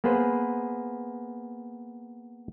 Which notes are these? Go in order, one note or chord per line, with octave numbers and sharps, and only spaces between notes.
A#3 B3 G#4 B4 C5